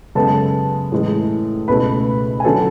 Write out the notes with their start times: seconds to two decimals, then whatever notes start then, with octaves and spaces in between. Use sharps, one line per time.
0.15 F#2 C#3 G#3 B3 A4 A5
0.92 A2 E3 G#3
1.68 C#2 B2 A3 B4 B5
2.40 G#5
2.44 D3 F#3 B3 A4 A5